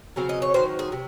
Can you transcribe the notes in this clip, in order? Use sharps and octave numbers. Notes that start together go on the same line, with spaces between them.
C#3 F#3 C4 F5
D#5
C#5
D#3 F#3 C#4 C5
G#4
C3